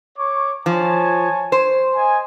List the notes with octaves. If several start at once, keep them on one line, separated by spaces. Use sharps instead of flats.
C#5 C#6 D6
F3 C#5 G#5 A5
C5
D#5 G#5